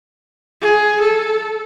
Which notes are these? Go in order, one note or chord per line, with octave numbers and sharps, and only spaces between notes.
G#4
A4